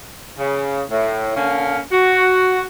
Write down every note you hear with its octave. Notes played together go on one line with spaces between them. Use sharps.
C#3
A2
D3 A#3 C#4
F#4